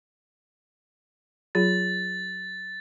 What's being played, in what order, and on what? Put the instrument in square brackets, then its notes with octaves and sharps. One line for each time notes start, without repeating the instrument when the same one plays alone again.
[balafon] F#3 F4 G#4 [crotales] A6